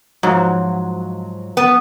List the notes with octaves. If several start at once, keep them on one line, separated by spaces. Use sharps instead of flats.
G#2 F3 F#3
B3